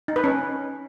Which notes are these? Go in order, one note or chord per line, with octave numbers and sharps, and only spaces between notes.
D#4
B4
C#4